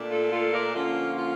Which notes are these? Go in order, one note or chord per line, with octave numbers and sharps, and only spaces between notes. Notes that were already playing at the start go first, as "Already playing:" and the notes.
Already playing: A#2 A3 D4
F4 A4
F4 A4
A#4 D5
D3 F3 A#3 C#4 F4
F4